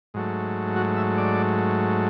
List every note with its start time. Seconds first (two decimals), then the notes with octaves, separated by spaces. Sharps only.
0.14 G#2 F#3 A3
0.76 F#4
0.96 E5
1.18 D5